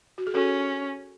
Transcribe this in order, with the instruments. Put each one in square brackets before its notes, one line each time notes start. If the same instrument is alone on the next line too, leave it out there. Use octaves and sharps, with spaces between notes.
[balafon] F#4
G#4
[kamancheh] C#4 [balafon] F#4 A4